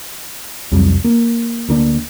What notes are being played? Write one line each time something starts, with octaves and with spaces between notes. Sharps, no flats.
C2 F2 F#3 G3
A#3
D2 A#3 D4